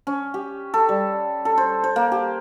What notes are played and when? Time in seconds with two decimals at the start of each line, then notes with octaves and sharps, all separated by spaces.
0.07 C#4
0.34 G4
0.74 A4
0.89 G3
1.45 A4
1.58 C5
1.84 C5
1.96 A#3
2.12 G4